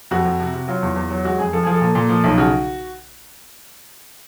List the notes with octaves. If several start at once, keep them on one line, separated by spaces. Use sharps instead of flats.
F2 F#4
F2
C3
C3
F#3 F4
E2
E2
F#3
G#3 F#4
F2 G#4
F3 A4
F3 G#4
A4
A#2
A#2
F3
B1
C#3 F#4